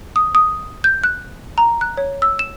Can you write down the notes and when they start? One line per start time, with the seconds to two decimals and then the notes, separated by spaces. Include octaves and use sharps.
0.16 D#6
0.35 D#6
0.84 G6
1.04 F#6
1.58 A#5
1.81 F#6
1.97 C#5
2.22 E6
2.39 E7